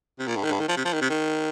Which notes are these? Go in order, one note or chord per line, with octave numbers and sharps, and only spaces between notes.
C3
A#2
G2
D#3
G2
D#3
F3
C3
F3
D#3
C3
D#3